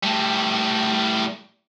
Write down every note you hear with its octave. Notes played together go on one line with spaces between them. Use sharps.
A2 G3